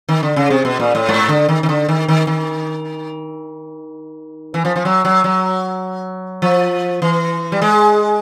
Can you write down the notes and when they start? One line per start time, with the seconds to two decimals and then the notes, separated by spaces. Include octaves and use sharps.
0.09 D#3
0.23 D3
0.36 C#3
0.50 C3
0.65 B2
0.80 A#2
0.95 A2
1.09 G#2
1.29 D3
1.49 D#3
1.63 D#3
1.69 D3
1.89 D#3
2.08 D#3
2.27 D#3
4.54 E3
4.65 F3
4.76 F3
4.85 F#3
5.05 F#3
5.24 F#3
6.42 F3
7.02 E3
7.52 G3
7.62 G#3